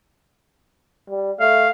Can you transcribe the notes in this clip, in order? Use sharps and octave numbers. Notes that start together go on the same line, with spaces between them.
G3
A3 F5